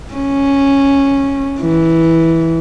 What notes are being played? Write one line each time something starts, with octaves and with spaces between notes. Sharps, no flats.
C#4
E3